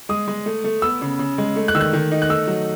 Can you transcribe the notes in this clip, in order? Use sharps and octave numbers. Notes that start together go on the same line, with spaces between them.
G#3 D#6
G#3
A3
A3
B3 E6
C#3
C#3
G#3
A3
F#6
D#3 E6
F#6
D#3
D#4
F#6
A3 E6
F#3